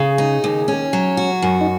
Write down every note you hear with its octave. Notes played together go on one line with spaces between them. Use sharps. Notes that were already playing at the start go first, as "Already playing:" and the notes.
Already playing: C#3 G#4
D#4
D#2
C#4
F#3
F#4
F#2
D#4